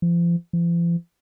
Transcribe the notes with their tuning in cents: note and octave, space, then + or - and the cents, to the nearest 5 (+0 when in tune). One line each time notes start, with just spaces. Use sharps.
F3 -35
F3 -45